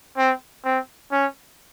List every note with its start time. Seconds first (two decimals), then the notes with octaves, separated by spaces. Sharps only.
0.17 C4
0.64 C4
1.12 C#4